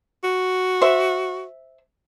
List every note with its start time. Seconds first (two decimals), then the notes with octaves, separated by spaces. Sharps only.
0.24 F#4
0.82 C5 E5